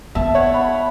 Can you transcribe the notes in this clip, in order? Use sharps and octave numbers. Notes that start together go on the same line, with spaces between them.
B3 E5 A5
C#5 F#5
F#5 B5